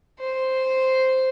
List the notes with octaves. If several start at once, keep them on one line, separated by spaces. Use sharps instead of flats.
C5